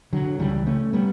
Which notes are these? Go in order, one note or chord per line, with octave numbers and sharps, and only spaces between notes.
D3 F#3
C#2 C#3 E3 G3
A3 C#4
G3 B3